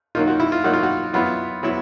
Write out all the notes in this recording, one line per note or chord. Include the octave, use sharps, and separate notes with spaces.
D#3 F#3 A#3 D#4 F4
F#4
E4
F4
D#3 F#3 A#3 D#4 F#4
F4
F#4
F#3 B3 E4 F4
F#3 B3 E4